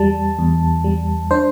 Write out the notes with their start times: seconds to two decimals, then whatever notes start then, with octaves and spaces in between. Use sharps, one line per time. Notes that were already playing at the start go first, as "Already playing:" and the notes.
Already playing: E2 G3 A5
0.39 E2
0.84 G3
1.31 D4 C5